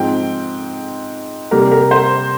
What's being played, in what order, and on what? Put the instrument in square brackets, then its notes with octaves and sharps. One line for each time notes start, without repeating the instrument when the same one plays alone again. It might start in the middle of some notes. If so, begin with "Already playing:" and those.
Already playing: [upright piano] G#2 F3 C4 G5
C3 G3 A#3 A#4
A#4
C5